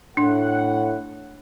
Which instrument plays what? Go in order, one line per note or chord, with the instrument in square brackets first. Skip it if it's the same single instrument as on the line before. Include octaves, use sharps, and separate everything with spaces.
[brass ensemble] A2 F#5 [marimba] D4